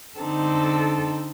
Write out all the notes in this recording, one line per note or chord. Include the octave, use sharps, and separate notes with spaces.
D3 C4 D#4 A4